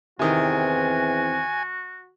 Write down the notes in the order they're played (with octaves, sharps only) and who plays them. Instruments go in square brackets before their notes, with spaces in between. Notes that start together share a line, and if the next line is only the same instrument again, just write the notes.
[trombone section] E2 E3 C4 [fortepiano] C3 D#3 [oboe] F#4 [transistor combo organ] G#5